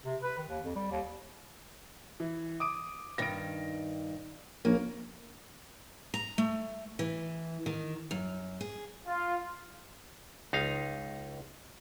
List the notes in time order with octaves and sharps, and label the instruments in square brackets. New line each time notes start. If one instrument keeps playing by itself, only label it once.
[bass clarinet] C3
B4
D#3
D#2
F2
G3
D#2
[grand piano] E3
D6 D#6 D7
[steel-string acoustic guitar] G2 D#3 [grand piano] A#6 D7
[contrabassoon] A#1 [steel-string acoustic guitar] A#3 [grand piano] C#4
[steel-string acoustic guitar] A#5
A3
E3
D#3
F#2
G#4
[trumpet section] F4
[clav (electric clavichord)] C#2 D#4 F5